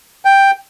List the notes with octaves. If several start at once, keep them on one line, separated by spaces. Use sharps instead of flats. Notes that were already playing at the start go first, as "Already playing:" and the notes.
G5